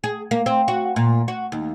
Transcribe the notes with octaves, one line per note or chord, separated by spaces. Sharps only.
G#4
A#3
C4
F#4
A#2
F#4
D#2